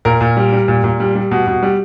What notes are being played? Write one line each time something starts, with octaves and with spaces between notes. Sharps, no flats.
A#2 A#4
A#2
G3
G3
A#2
A#2
G3
G3
B2
B2
G3